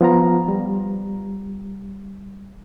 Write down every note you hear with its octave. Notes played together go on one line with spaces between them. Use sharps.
F3 B3 F4 A#5
G3